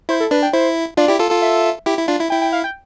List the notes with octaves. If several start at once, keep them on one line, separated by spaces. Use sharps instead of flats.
E4 C5
A4
D4 B4
G5
E4 C5
D4 F4 D5
E4 G4
F4 A4
F4 A4
E5
E4 G4
E4
D4 F4
E4
E4 G5
G5
F5
G5